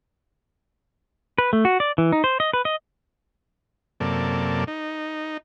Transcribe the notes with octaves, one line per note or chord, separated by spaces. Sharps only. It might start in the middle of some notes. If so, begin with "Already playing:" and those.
B4
A3
F#4
D5
E3
D#4
C5
D#5
B4
D#5
F#2 C3 A#3 A4 D5
D#4